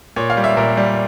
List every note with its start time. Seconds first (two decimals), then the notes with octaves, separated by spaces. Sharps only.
0.16 A#2 C#5
0.30 F5
0.37 G3
0.44 E5
0.57 A#2 A#4
0.77 G3